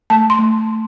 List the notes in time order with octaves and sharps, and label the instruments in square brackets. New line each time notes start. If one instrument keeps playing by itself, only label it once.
[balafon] A3 A5
C6
A3